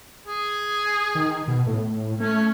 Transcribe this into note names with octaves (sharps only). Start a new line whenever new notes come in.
G#4
D#3
B2
A2
A3 C#4